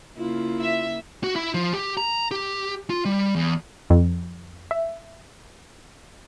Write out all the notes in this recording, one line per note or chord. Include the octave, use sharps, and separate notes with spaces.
C#3 A#3 E4 F4
E5
F#4
E4
F3
G4
A#5
G4
F4
G3
E2
F2
E5